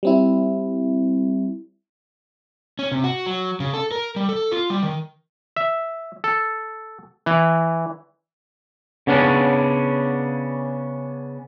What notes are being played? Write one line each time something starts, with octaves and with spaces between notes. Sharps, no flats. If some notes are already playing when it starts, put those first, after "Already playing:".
G3 C4 E4
C#4
C3
F#4
F#3
C#3
A4
A#4
G3
A4
F4
G3
D#3
E5
A4
E3
C#3 B3 C#4 D4